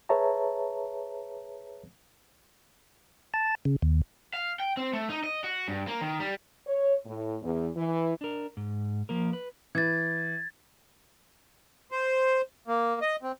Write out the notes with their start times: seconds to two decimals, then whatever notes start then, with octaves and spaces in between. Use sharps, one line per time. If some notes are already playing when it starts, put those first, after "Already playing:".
0.09 G#4 B4 C#5 E5 A5 A#5
3.34 A5
3.65 C#3
3.82 D#2
4.34 F5
4.60 G5
4.77 C4
4.93 A3
5.09 D#4
5.24 D#5
5.44 F#4
5.68 G2
5.87 A#3
6.01 D#3
6.20 G3
6.67 C#5
7.06 A2
7.42 E2
7.76 E3
8.21 D4 A#4
8.57 G#2
9.09 F3 A#3 A#4
9.33 B4
9.75 E3 G#6 A6
11.92 C5
12.68 A#3
13.02 D#5
13.23 C4